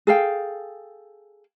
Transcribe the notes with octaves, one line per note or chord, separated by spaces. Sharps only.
G#4 A4 F5 G5